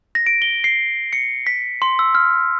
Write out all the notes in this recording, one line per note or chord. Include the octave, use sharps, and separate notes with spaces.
A#6
D7
G7
C7
C#7
B6
C6
E6
F6